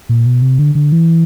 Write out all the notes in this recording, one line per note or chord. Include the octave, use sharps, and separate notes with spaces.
A#2
B2
C3
D3
D3
E3